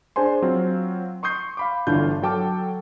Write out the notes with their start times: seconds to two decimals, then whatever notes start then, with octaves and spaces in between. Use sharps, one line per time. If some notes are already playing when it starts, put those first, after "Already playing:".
0.16 D4 G#4 C5 G#5 C6
0.42 F#3 C4 F4
1.23 C6 C#6 D#6 G6 C7
1.57 F5 B5 D6
1.87 G1 D3 E3 D4 F4 G6
2.22 F#3 A4 G5 A5 D6 F6